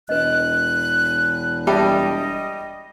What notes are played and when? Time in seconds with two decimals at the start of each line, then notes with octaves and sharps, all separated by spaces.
0.09 E1 B4 D#5 F#6
1.67 G3 D#5 E5 A5 D6